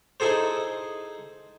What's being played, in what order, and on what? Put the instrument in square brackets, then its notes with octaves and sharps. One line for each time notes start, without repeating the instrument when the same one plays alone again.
[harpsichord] D#4 E4 G#4 A4 C5